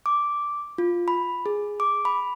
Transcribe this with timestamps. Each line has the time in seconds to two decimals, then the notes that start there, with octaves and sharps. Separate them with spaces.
0.06 D6
0.78 F4
1.08 B5
1.46 G#4
1.80 D6
2.05 B5